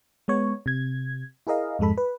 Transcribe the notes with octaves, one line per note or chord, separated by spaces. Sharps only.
G#3 B3 C#5
C3 G#6
E4 G#4 A#4 D#5 F5
F2 G#2 G#3 A4 B5
B4